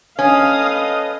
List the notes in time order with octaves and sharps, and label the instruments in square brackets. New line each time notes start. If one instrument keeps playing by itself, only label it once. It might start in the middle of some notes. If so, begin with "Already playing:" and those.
[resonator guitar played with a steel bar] C#4 [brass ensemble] A4 B4 D#5 [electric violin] F5 D#6